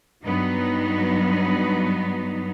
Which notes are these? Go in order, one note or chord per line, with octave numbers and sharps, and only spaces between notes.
G2 F#3 B3 D#4